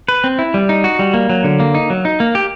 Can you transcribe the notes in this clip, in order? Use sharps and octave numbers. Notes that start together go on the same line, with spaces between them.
B4
C4
E4
G3
D#4
F#4
G3
A#3
F#3
D3
A#3
D#4
F#3
D#4
A#3
G4